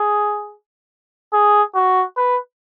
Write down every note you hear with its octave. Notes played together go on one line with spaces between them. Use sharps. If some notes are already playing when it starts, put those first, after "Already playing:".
Already playing: G#4
G#4
F#4
B4